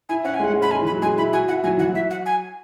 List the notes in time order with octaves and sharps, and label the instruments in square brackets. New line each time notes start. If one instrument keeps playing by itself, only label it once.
[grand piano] E4 [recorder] G#5
[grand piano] C#4 [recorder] F#5
[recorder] G#5
[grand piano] G#3
[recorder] F#5
[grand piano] G#3
[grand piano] C#4 [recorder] B5
[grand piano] G#3 [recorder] G#5
[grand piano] E3
[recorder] B5
[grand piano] F#3
[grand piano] G#3 [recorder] G#5
[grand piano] E4 [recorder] B5
[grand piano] F#4 [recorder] G#5
[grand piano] E4 [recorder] F#5
[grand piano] F#3 [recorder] G#5
[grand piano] E3 [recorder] F#5
[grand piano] F#3
[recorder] E5
F#5
G#5